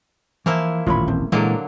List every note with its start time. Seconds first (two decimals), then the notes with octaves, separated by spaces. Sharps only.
0.46 E3 F3 A#3 E4
0.86 D#1 A1 F4 C#5 B5
1.08 A3 C4
1.32 A#2 D3 E3 F#3 G#3 A#3 G#4 A4